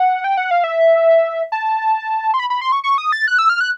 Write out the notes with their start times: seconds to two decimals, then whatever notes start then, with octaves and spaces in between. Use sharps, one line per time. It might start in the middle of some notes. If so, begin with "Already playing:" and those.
Already playing: F#5
0.24 G5
0.37 F#5
0.51 F5
0.64 E5
1.52 A5
2.34 C6
2.39 B5
2.50 B5
2.61 C6
2.72 C#6
2.84 C#6
2.98 D#6
3.12 A6
3.28 F#6
3.38 E6
3.49 F6
3.61 F#6